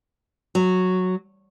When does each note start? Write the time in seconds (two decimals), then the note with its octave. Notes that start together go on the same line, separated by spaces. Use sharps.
0.55 F#3